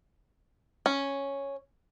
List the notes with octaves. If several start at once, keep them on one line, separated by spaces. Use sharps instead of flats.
C#4